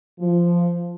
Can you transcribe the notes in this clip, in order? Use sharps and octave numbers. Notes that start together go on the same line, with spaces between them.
F3